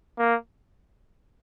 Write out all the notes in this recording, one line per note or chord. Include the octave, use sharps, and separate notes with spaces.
A#3